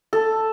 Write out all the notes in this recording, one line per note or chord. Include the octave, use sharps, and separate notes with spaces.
A4